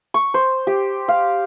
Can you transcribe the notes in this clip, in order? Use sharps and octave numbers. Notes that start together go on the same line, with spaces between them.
C#6
C5
G4
F5